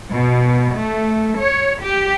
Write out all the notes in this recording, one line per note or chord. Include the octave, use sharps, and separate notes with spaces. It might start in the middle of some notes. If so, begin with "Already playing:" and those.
B2
A3
C#5
G4